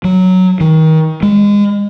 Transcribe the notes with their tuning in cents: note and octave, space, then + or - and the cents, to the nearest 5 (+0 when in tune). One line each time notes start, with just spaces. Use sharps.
F#3 +0
D#3 +30
G#3 -25